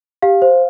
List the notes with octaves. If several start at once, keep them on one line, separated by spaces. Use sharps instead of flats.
G4 F5
C5